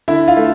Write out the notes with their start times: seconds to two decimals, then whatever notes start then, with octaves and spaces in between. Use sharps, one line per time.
0.08 D3 E4 E5
0.28 F4 F5
0.37 A3